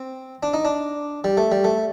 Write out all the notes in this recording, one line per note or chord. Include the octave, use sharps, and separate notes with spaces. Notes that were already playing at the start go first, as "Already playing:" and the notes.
Already playing: C4
D4
D#4
D4
G3
A3
G3
A3